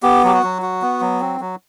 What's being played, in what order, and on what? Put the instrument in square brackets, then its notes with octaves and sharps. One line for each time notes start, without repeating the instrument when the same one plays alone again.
[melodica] B3 G4
F#3 G4
F#4
F#3
F#4
B3
F#3
C4
F#3